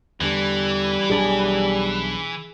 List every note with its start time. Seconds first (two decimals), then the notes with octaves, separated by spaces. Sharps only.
0.21 E2 D3 E3 G3
1.10 B1 D4 G#4 B5